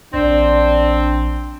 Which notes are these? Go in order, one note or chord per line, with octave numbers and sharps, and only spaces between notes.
A#1 C4 D4